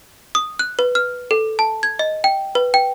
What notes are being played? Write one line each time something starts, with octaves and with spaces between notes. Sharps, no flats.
D#6
F#6
B4
F6
A4
A5
G#6
D#5
G5
B4
G5